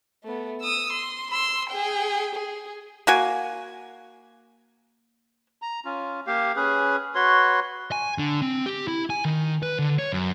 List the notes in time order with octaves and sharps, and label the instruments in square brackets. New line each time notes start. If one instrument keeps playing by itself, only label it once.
[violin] A3 B3
D#6 E6
C6
C6 E6
G#4 G5
G#4
[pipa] A#3 F#4 G#5
[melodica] A#5
C#4 F4
A#3 G4 F5
C#4 G#4 B4
F#4 B4 C#5 C6
[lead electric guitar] G#5
D3
C4
G4
E4
G#5
D#3
B4
D3
C#5
F#2